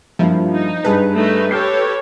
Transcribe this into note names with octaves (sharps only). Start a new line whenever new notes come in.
G2 F3 A#3 E4
D#4
G2 G#4 B4 A5
A3 D#4
G4 A4 C#5 F6 G6 C7